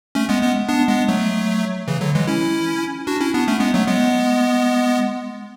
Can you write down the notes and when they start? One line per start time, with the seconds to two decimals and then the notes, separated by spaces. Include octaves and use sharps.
0.15 A3 C#4
0.29 G#3 B3
0.42 G#3 B3
0.69 B3 D4
0.88 G#3 B3
1.08 F#3 A3
1.88 C#3 E3
2.01 D3 F#3
2.15 E3 G#3
2.27 C#4 E4
3.07 D4 F#4
3.20 C#4 E4
3.34 B3 D4
3.48 A3 C#4
3.60 G#3 B3
3.74 F#3 A3
3.87 G#3 B3